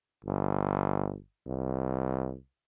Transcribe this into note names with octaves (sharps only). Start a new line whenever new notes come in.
G1
C2